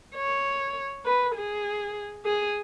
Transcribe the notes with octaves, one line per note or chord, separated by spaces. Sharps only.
C#5
B4
G#4
G#4